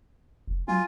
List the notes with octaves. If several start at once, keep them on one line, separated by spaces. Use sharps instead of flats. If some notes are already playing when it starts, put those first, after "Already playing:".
F1
F#3 F4 G#5